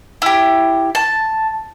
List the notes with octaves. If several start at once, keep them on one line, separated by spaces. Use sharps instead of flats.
E4 G4
A5